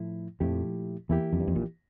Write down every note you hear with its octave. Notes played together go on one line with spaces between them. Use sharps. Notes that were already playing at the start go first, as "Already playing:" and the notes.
Already playing: A2 F3 A3 E4
F2 A#2 F3 A3 E4 G4
E2 E3 A#3 E4 G4
F2
G2
F2
A#1 A#2